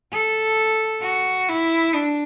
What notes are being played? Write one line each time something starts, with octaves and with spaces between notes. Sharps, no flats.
A4
F#4
E4
D4